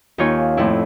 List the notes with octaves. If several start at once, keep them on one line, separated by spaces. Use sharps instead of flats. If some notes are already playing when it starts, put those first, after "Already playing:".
D#2 D#4 F4 C#5 G#5
F2 A2 E4